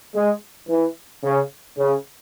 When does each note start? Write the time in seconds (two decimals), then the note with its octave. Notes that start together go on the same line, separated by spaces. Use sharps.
0.14 G#3
0.68 E3
1.24 C#3
1.77 C#3